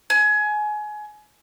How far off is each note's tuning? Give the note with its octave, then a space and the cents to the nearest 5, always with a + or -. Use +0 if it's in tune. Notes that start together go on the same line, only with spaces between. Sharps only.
G#5 +25